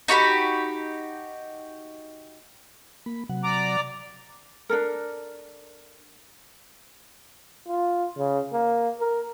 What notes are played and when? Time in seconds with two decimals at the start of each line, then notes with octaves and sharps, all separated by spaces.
0.08 D#4 F#4 G4 B5
3.06 A#3 B5
3.29 C3 F#3 F#5
3.44 D5 A#5 D6
4.69 D4 A4 A#4
7.68 F4
8.18 C#3
8.53 A#3
9.00 A#4